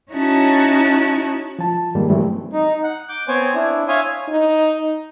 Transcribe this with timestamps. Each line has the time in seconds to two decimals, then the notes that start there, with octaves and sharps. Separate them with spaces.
0.12 C#4 D#4 E4 F#4 C#5 A5
1.59 F3 A5
1.95 G2 D#3 G3 G#3 A#3
2.09 E3 F#3 G3 A3 C4
2.53 D#4
2.84 F#5
3.09 D6 G6
3.28 B3 C4 C5 C#5 G#5
3.54 D4 E4
3.88 C#5 E5 F5 G#5 C6 D#6
4.28 D#4